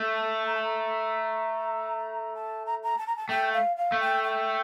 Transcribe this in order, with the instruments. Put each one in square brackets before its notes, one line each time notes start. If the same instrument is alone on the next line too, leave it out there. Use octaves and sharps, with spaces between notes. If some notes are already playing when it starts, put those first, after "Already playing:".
Already playing: [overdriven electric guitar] A3
[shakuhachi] A5
A#5
A5
A#5
A5
A#5
A#5
A5
A#5
A5
[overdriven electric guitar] A3 [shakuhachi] G5
[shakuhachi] F5
F5
[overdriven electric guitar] A3
[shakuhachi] G5
G5